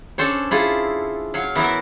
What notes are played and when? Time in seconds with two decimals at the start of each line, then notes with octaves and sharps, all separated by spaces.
0.18 C#4 D4 A4 C5 C#5
0.51 E4 F4 G#4 A4
1.34 F#3 C#5 F5
1.55 E3 B3 E4 A#4